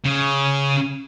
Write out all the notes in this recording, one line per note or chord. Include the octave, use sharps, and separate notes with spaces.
C#3